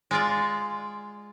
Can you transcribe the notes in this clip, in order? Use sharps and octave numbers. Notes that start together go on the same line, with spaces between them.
G#3 F4 D5